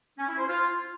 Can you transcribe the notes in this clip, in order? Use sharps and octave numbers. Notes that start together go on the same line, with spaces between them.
C#4
E4
C5
F4